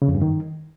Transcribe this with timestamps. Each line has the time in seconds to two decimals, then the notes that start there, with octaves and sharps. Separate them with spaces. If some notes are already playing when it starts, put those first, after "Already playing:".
0.02 C#3
0.08 F2
0.15 G2
0.22 D#3